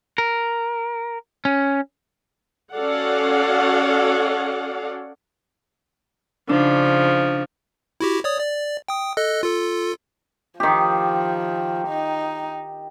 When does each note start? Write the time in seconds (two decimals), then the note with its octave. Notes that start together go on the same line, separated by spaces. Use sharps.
0.18 A#4
1.45 C#4
2.74 C#4 F#4 A4 D5 F5 F#5
6.49 C#3 F3 D4 D#4
8.00 E4 F#4 G4
8.24 C#5 D5 D#6
8.40 D5
8.88 G5 D#6
9.17 A4 D#5 F#6
9.43 F4 A4
10.60 D#3 F3 G4
11.88 D#4